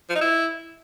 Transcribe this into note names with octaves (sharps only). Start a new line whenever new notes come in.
F3
D#4
E4